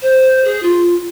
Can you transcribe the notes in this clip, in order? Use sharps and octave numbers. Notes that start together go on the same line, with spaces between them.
C5
G#4
F4